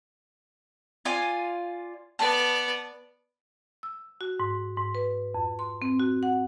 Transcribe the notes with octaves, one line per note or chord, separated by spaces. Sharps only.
F4 D5 G#5
B3 D5 A5
E6
F#4
G#2
G#2
B4
F2
C6
C4
F#4
F#5